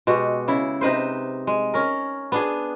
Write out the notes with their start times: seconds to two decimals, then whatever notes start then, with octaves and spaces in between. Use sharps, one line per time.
0.07 B2 G#3 F#4 G4
0.48 C#3 E4
0.81 C3 D#4 B4 C5
1.47 G#3
1.74 C#4 A#4
2.32 B3 D4 G#4